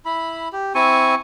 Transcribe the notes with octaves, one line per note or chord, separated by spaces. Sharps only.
E4 B5
G4
C4 E4 G#5 C#6